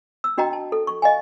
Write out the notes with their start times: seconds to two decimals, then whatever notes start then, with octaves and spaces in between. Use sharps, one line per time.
0.24 E6
0.38 D4 F#4 D#5 G5 A#5
0.53 A5
0.72 A4
0.87 C#6
1.02 D#5 F5 G#5